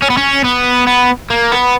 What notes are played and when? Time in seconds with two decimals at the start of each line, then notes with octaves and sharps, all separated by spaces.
0.02 C#4
0.10 B3
0.17 C#4
0.44 B3
0.87 B3
1.30 A#3
1.52 B3